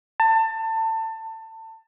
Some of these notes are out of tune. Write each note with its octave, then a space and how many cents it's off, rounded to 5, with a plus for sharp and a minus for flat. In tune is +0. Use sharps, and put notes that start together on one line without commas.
A5 +25